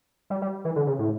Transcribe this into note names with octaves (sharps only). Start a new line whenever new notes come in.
G3
G3
E3
D3
C#3
A2